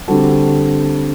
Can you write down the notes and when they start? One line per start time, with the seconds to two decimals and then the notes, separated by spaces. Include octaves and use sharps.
0.08 D3 G3 C4 F#4 A4